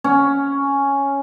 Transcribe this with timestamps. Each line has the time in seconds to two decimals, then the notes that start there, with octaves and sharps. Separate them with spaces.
0.04 C#4